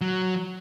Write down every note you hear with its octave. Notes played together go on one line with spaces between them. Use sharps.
F#3